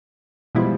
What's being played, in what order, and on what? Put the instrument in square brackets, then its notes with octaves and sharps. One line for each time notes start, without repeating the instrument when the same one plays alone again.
[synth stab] B2 G#3 B3 E4 [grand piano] F3 G3